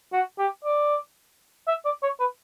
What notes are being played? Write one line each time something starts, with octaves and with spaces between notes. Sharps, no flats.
F#4
G4
D5
E5
D5
C#5
B4